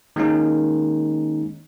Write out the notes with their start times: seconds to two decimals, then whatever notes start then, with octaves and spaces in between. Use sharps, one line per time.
0.16 D#3 G#3 A#3 C#4 D#4